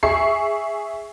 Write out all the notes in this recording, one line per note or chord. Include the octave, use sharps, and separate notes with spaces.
G#4 E5 C#6 C7